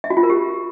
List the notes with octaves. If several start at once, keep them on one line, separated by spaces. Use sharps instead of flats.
E5
F#4
F4
A#4
G4